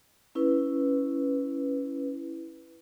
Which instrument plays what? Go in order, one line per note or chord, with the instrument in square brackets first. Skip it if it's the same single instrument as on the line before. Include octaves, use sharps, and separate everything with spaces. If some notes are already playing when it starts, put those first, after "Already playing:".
[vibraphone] C#4 E4 B4